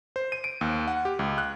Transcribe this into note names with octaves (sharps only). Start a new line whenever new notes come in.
C5
D#7
D7
D#2
F#5
G4
C#2
F#6